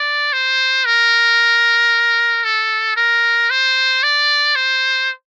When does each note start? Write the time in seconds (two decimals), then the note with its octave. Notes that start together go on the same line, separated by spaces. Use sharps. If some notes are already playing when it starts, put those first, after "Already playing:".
Already playing: D5
0.33 C5
0.85 A#4
2.44 A4
2.96 A#4
3.50 C5
4.03 D5
4.56 C5